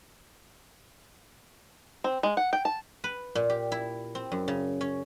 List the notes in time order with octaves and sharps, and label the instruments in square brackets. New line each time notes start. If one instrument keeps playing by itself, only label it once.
[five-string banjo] C4
G#3
F#5
G5
A5
[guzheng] B4
A#2
G4
E4
C4
F#2
C#3
C#4